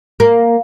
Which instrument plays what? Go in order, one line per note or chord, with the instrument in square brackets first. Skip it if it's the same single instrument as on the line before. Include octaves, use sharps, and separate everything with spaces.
[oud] A#3